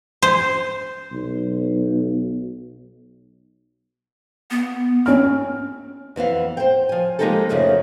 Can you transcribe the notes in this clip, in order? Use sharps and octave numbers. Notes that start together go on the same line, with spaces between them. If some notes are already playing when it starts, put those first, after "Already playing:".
C5
B1
B3
C4 C#4 F6
F2 E3 B3 F5
C5 G5
F3 G#5
F3 G#3 A#3 D#4 G4 A4
F#2 C#3 F3 A3 D#4